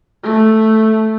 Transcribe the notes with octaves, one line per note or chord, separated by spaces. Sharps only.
A3